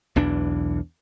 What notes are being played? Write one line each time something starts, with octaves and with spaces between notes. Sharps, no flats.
B1 E2 E3 D4